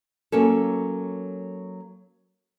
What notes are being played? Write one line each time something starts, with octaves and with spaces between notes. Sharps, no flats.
F#3 A#3 C#4 A4